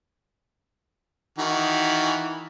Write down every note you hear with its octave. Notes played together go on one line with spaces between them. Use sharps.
D#3 E3 F#4